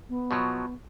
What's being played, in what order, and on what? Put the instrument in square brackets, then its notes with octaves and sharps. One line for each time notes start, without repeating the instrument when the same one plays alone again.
[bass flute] B3
[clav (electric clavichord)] B2 F3 F#3